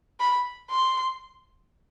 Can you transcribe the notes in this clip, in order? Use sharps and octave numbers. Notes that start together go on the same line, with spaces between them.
B5
C6